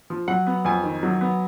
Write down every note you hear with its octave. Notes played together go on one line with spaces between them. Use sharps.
F3
F#3 F#5
B3
F2 G#5
D#3
F#3
B3